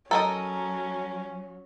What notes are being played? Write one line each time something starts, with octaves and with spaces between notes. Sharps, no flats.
F#3 C#4 A4 A#4 D#5 A#5